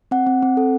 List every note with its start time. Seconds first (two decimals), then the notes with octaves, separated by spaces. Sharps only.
0.11 C4 F#5
0.27 C4
0.42 C4
0.57 A4